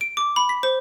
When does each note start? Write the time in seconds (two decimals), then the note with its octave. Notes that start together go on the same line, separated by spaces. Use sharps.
0.01 D7
0.17 D6
0.36 B5
0.49 B6
0.63 C5